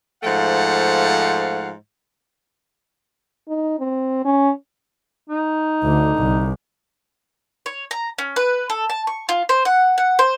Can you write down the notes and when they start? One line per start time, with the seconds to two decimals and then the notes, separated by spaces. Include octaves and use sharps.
0.23 G#2 F3 A3 F5 F#5
3.48 D#4
3.79 C4
4.25 C#4
5.29 D#4
5.83 D2 D3
6.18 C2
7.66 C#5
7.91 A#5
8.18 C#4
8.36 B4
8.70 A4
8.90 A5
9.07 C#6
9.29 F4
9.49 C5
9.65 F#5
9.98 F#5
10.19 C5